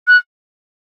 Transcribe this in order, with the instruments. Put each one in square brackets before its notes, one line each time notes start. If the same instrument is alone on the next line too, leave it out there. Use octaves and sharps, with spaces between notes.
[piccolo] F#6